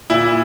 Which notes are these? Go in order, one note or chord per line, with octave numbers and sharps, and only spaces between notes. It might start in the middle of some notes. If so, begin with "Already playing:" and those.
A#2 E4